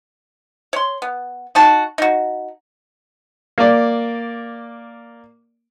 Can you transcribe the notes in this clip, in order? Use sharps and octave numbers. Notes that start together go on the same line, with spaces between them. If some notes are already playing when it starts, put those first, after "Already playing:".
C#5 C6
B3
D#4 F#4 A5
D#4 F#4
A#3 D5